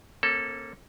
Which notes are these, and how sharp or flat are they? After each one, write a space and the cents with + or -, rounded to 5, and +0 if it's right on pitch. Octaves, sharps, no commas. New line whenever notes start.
A#3 +0 C#4 -40 A4 +0